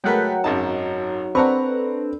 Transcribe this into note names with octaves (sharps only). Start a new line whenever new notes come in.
F#3 G#3 A3 A#4 B4 F#5 G5
G#1 F#2 D#4 A5
C4 D4 A4 B4 F#5 A#5 C#6